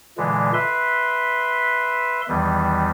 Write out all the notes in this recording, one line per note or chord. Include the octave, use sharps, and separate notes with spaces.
A#2 D3 E3 G#3
B4 E5 C6
E2 D#3 E3 G3